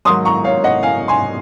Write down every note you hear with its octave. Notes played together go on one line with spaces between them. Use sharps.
G#2 D#3 F#3 C6 D#6
A#5 C#6
C#5 F5
D#5 F#5
F5 G#5
G#5 C6